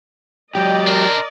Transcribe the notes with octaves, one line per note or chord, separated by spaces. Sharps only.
F#3 G4 D5 D#5 G5
D4 A#4 C5